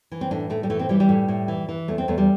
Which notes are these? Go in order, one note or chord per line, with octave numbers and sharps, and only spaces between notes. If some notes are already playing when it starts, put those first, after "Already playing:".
E3
C4
A2 D4
A2 A3
G3
E3 A3
C4
E3 G3
G3
A2
A2
E3
E3
E2 A3
C4
E2 A3
G3